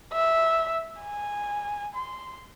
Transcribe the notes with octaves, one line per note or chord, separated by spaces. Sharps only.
E5
G#5
C6